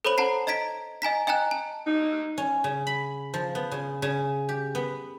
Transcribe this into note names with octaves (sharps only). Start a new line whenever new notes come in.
A4 C5 C#5 B5 D#7 F#7
F#5 A5 A#5 C7
D#5 A#5 G#6 B6 D7
D#5 G#5 A#5 B6
D#5 G5 G#5 A#5 F#6
A5
D#4
C#4
C#3
B5
F3
B3
C#3
C#3
G4
B3